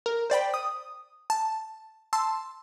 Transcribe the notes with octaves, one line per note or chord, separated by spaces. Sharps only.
A#4
C5 D5 G5 B5
D#6
A5
A5 C6 E6